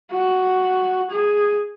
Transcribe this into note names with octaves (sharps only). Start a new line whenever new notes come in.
F#4
G#4